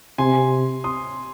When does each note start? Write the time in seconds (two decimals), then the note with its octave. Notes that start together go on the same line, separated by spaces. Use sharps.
0.18 C3 G#5 C6
0.84 C6 D#6